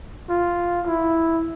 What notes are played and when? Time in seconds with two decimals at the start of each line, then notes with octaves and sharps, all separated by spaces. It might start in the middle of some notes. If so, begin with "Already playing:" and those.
0.29 F4
0.87 E4